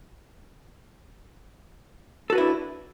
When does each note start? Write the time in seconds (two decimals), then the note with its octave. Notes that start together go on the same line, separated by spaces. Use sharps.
2.30 A4
2.32 F#4
2.35 B4
2.38 E4
2.40 D4